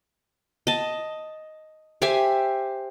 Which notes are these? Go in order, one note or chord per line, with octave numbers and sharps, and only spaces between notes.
D#5 A5
G4 C5 E5 G#5